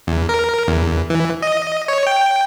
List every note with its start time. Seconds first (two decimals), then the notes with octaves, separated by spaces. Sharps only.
0.07 E2
0.29 A#4
0.68 E2
1.10 E3
1.42 D#5
1.88 C#5
2.07 G5